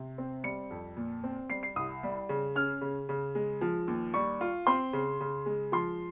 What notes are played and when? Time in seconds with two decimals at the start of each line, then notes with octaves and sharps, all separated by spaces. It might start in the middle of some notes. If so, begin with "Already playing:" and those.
Already playing: C3
0.18 C4
0.44 G3 C#7
0.71 F2
0.97 A#2
1.24 C4
1.50 G3 C7
1.63 C7
1.76 C2 D#6
2.03 G3
2.29 C#3
2.56 C#4 F6
2.81 C#3
3.09 C#3
3.35 G#3
3.61 F3
3.88 D#2
4.14 G3 C#6
4.41 F4
4.67 C4 C6
4.93 C#3
5.20 C#3
5.46 G#3
5.72 F3 C6